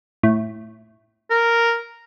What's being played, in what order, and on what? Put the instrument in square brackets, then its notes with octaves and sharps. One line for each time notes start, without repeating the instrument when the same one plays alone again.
[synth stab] A2
[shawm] A#4